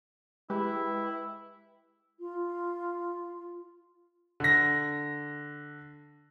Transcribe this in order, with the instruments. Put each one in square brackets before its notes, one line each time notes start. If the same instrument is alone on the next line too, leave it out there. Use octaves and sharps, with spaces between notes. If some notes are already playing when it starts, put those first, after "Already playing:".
[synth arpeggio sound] G#3 G4 B4 [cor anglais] E4
[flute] F4
[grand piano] D3 A#6